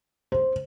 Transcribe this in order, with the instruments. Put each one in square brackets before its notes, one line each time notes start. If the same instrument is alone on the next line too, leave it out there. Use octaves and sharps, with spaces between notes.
[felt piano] C5